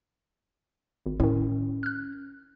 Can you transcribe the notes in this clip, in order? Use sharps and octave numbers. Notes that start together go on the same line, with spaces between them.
G#1
A2 D#3 C#4
F6 F#6